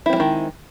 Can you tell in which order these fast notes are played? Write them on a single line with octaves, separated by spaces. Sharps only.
E4 C4 G3 G#3 D#3